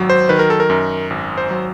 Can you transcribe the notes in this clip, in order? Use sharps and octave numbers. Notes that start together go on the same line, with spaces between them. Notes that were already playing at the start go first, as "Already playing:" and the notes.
Already playing: G#1 F#3
C5
D#3 B4
A#4
A4
A#4
F#2
G#1
C5
F#3